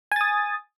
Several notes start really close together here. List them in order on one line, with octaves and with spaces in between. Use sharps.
G#5 A6 D#6